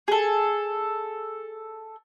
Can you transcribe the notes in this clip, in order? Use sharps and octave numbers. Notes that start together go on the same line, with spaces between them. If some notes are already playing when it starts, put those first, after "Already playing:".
G#4 A4